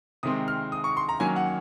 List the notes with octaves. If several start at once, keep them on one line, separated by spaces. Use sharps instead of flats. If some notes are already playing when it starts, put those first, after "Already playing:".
C3 D#3 G#3 C4 D#6
F6
D#6
C#6
C6
A#5
D#3 F#3 A#3 C#4 G#5
F#5